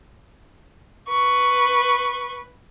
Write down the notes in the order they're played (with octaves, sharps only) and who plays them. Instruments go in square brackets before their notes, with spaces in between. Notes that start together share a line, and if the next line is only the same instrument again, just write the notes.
[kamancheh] B4 C#6